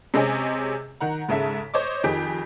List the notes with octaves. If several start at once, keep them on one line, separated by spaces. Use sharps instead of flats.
C3 G#3 C4 C#4 D#5 G#5
D#3 F#5 A#5
G#2 C#3 A4 E5 B6
C5 C#5 D#5 D6
F2 D#3 G4 G#4 B6